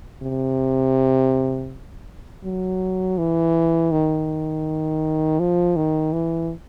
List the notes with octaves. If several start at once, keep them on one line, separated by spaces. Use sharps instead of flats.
C3
F#3
E3
D#3
F3
D#3
E3